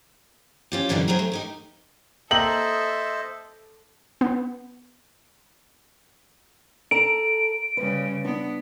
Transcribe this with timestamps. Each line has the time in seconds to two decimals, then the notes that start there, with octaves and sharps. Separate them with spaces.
0.72 C#4 F4 G4
0.89 F#2 B2 D3 E3 G3
1.08 F#3 G#3 C4 G#4 A#4
1.19 A3
1.32 D#4 G4 A#4
2.31 A#3 C4 D#4 A4 C5 D#5 E5 F#7
4.21 B3
6.91 A4 A5 A#5 D7
7.77 C#3 G3 B4
8.25 B3 D4